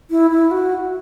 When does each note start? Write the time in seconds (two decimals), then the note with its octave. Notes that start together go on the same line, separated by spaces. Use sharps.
0.11 E4
0.31 E4
0.51 F#4